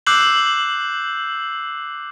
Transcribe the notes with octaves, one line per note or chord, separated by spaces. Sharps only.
D6 E6 F#6 G6 C7 F#7